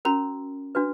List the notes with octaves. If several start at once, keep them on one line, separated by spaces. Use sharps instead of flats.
C#4 F#4 A#4 A#5
D4 F#4 B4